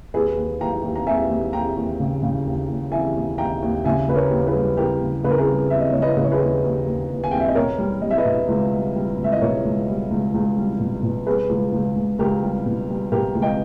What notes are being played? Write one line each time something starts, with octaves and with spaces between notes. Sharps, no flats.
D#2 G#4 B4
D#2
D#2 G5 A#5
D#2
A#5
D#2 E5 G#5
D#2
D#2 G5 A#5
D#2
C#3
C#3
D#2
D#2
E3 E5 G#5
D#2
D#2 G5 A#5
D#2
C#3 E5 G#5
C#3 B4
A#4 C#5
D#2
G#4 B4
G3
C#3 G4 A#4
C#3
C#3 B4
A#4
G#4 B4
G3
D#2 E5
D#5
C#3 C#5
B4 D#5
C#3 B4
C#5
G#4 B4
D#2
D#2
D#2
D#2
G#5
D#2 G5
E5
D#5
B2 A#4 C#5
G3
G3 D#5
E5
B4 D#5
B2
C#2
G3
G3
C#2
E5
D#5
B2 A#4 C#5
C#2
G3
C#2
C#2
G3
B2
B2
G3 G#4 B4
C#2
C#2
C#2
C#2 G4 A#4
G3
B2
G3
B2 G4 A#4
C#2
D#5 G5